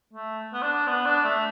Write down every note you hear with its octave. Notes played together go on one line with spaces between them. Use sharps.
A3
B3
D4
B3
D4
A3